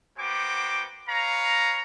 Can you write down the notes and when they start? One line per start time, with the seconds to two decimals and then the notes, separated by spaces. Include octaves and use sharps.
0.19 A#3 B3 F#4 C5 G5 D6
1.08 B4 C#5 F5 A#5